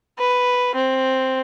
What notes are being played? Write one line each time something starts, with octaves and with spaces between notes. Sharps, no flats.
B4
C4